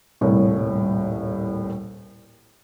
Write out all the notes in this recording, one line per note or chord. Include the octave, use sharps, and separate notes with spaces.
D#1 C2 A2 A#4 C#5